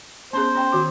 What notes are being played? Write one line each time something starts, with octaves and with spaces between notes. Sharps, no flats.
B3 C#4 G#4 C5
C#4 G5
D#3 F#4 D6